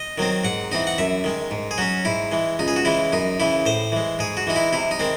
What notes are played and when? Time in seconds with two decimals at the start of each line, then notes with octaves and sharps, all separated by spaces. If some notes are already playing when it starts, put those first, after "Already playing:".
Already playing: D#5
0.18 D#3 F#3 C4
0.44 G#2 F#5
0.72 E3 C4 D#4
0.87 F#5
0.98 F#2 E5
1.24 D#3 G#3
1.51 G#2
1.71 G#4
1.78 F#3 C#4 F#4
2.05 G#2 E4
2.32 E3 G#3
2.59 C#2 D#4
2.68 G#4
2.76 F#4
2.85 C#3 E3 G#3 E4
3.12 F#2 D#4
3.40 C#3 E3 E4
3.66 A2 C5
3.92 E3 G#3
4.19 G#2 G#4
4.37 F#4
4.47 E3 G#3 D#4
4.56 E4
4.73 C3 E4
4.91 D#4
5.00 D#3 G#3 C4